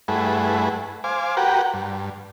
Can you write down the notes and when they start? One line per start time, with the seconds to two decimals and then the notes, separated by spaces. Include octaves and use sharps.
0.08 G2 A3 E4 G#4 B4 F#5
1.04 C5 F5 G#5 D6
1.37 F#4 G4 A#4 B4 F#5 G5
1.74 G2